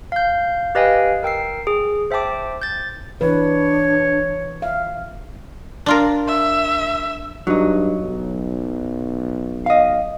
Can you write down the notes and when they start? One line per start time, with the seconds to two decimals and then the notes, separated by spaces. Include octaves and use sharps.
0.12 F5 G6
0.75 G4 B4 D#5 F5 G5 G#5
1.23 A#4 G5 E6 C7
1.67 G#4
2.11 C5 E5 G5 A5 D6
2.62 G6 A6
3.21 E3 D4 B4 C#5
4.62 E5 F5
5.86 D4 F4 A#4
6.27 E5
7.47 G2 F#3 D#4
8.03 B1
9.66 D#5 F5